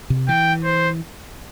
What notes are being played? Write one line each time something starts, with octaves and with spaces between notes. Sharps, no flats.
C3
E3 G5
C5